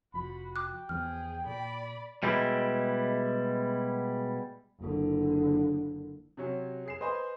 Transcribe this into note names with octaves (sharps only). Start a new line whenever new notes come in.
F1 F3 F#4 B5
G5 D6 F#6
E2 F3 B3 G#4 F6
A#2 D5 B5
B2 G3 G#3 E4
F#1 D3
C3 F#3 C#4
G#4 C7 E7
B4 C5 D#5 G#5 B5 C6